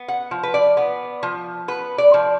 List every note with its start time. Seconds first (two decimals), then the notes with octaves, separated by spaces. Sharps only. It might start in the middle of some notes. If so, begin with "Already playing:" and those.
Already playing: B3
0.08 F#5
0.31 F3
0.43 B4
0.54 D5
0.77 B3
1.23 F3
1.68 B3 B4
1.98 D5
2.14 F3